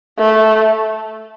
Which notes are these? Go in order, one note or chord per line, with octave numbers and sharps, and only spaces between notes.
A3